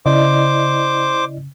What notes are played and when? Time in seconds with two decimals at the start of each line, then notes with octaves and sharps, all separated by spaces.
0.06 C#3 E4 C5 D5 D#5 D6